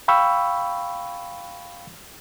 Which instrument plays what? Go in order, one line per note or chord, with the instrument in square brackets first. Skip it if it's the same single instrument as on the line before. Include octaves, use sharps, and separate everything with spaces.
[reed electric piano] F5 G5 B5 C#6 E6